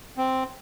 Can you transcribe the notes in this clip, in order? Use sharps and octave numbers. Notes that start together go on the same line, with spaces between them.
C4